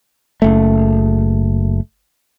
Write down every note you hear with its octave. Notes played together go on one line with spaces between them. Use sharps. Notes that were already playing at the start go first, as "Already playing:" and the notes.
F#1 A3